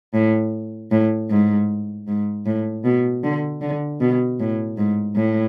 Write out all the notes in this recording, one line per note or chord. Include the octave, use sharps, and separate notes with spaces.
A2
A2
G#2
G#2
A2
B2
D3
D3
B2
A2
G#2
A2